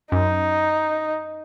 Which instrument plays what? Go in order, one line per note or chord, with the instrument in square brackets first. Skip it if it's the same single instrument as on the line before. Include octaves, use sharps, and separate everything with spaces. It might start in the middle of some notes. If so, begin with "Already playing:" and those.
[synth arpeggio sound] F#2 [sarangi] D#4